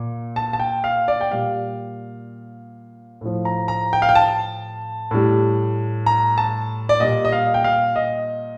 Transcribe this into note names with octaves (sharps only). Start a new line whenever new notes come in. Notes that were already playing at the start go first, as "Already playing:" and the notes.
Already playing: A#2
A5
A5
G5
F5
D5
G5
A#2 G3 F5
A2 F3
A#5
A#5
G5
F5
G5
A5
A2 G3
A#5
A5
D5
A#2 G3 D#5
D#5
F5
G5
F5
D#5